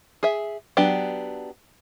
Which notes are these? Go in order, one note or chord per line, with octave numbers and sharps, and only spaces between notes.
G#4 E5
F#3 B3 D4 G4